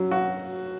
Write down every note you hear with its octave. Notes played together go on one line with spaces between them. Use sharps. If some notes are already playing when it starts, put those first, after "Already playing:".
Already playing: F#3 C#4
F#4